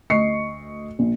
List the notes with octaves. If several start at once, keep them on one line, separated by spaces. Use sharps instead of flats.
D2 D#5 C#6 C7 C#7
A#1